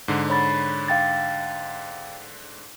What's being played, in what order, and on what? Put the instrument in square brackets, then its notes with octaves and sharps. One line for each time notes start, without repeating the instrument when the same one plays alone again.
[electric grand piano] G#2 D3
[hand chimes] C#5 B5 A6
F5 G5 A6